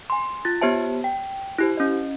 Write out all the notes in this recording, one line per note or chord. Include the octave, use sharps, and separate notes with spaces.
G#5 C6
F4 A6
B3 G4 C5 C#5 E5 A5
G5
E4 G4 C5
C#4 D#5